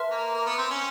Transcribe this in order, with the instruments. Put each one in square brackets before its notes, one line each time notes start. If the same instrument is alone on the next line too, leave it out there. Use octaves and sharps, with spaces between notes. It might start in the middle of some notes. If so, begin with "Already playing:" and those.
Already playing: [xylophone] B4 E5 A5 C6 F6
[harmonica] A#3
A#3
B3
C4
C#4